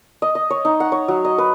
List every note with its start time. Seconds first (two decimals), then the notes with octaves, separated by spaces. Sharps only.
0.22 D#5
0.35 D#5
0.50 C#5
0.65 D#4
0.80 F#5
0.92 C#5
1.08 F#3
1.25 D#5
1.38 B4